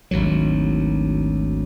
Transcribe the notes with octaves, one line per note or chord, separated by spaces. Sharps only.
G#1 D2 F#3